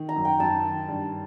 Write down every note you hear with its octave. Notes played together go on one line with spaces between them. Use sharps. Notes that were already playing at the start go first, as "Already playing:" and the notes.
Already playing: D#3
A#5
F#2
G5
F#2 A5
D#3
G2